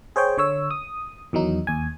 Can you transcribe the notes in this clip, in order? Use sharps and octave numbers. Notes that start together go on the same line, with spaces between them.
G#4 C5 C#5 G5
D3 C#5 E6
D#6
E2 D#3 F#3 D#4
D#2 G#5